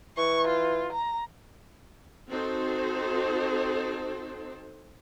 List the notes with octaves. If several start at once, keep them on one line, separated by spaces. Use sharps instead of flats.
E3 C#6
F4
A#5
C4 D#4 F#4 A4 C5